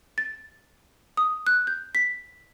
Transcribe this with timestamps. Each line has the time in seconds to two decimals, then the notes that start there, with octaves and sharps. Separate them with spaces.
0.18 A6
1.17 D#6
1.47 F#6
1.67 G6
1.95 B6